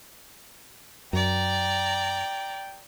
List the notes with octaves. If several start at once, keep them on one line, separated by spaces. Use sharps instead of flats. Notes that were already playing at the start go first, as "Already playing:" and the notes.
F#2 D5 G5 A#5